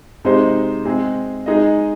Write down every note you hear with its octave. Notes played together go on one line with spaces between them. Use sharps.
C3 G#3 D#4 C5
G#3 C4 G#4 D#5
G#3 D#4 G#4 D#5